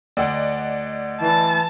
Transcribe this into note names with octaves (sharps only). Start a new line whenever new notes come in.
D2 D5 D#5 F#5
E3 A5